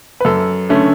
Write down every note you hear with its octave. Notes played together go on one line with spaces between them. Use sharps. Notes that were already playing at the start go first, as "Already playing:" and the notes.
B4
F#2 A4
D3 A3 C#4